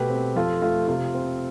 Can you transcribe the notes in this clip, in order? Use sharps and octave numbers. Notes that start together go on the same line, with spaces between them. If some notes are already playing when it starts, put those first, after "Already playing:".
Already playing: B2 A3 G4 B4
C4
F2 F4 A4
A3 F4
C3 F4
C4